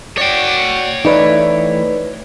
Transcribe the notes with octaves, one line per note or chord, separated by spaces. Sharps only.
F#4 C#5 D5 G5
E3 A3 D#4 E4 B4 D5